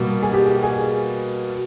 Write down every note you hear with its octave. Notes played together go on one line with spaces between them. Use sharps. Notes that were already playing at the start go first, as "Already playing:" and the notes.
Already playing: B2 G3 A#3
G#4
G4
G#4